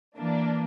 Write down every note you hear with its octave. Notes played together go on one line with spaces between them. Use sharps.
E3 A#3 D4